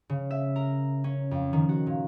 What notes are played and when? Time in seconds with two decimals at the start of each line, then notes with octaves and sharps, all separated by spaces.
0.10 C#3
0.31 E5
0.56 A#4
1.04 C#4
1.31 F2
1.53 D#3
1.69 F#4
1.87 A#2